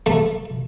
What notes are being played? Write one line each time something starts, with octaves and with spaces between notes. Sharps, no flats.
A3